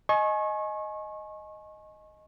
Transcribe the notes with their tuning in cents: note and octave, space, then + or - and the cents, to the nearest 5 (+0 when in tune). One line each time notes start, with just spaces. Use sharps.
D#5 +0 G#5 +30 C#6 -30